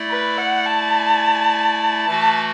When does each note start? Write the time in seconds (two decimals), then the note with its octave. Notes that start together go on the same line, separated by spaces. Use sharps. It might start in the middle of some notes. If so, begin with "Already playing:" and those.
Already playing: A3 E4 D5
0.10 B4
0.38 F#5
0.66 A5
2.06 E3 A3 F#4 A5